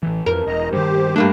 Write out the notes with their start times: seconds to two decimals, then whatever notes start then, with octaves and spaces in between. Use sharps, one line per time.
0.03 A1 E3
0.26 F2 E3 A#4
0.46 E1 D#5 A#5
0.73 G2 D#3 G4 C5
1.16 G2 A3 A#3 D4